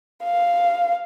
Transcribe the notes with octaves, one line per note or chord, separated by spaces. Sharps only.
F5